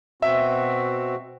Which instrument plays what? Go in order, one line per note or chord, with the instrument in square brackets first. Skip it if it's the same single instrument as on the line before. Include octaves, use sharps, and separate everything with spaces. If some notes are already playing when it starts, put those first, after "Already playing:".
[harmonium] B2 C4 F#4 [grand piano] E5